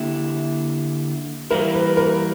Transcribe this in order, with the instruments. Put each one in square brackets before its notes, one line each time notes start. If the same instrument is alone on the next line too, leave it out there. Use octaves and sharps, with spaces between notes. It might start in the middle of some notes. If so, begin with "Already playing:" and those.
Already playing: [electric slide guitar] D3 A#3 E4 G4
[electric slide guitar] E3 G3 A#3 E4 [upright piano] A#4
[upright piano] B4
A#4